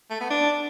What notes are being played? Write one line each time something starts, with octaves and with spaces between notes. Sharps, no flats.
A3
B3
D4